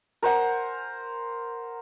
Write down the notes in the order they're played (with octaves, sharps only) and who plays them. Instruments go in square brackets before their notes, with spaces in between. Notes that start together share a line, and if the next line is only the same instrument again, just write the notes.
[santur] A#4 C5 F#5 G#5